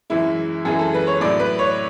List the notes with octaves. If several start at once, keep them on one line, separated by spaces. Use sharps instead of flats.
F#2 E3 G#3 E4
F#2 E3 G#3 G#4
A4
B4
C#5
A2 F#3 D5
B4
C#5